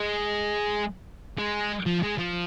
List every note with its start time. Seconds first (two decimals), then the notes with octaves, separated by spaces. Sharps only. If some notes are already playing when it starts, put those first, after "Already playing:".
Already playing: G#3
1.38 G#3
1.86 F3
2.03 G#3
2.18 F3